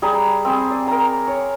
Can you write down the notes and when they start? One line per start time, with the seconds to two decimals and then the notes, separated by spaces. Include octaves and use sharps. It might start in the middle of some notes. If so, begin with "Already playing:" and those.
0.02 G3 G#4 A#5 B5
0.45 C4 G#4
0.70 D5
0.87 A#4 A#5
1.27 C#5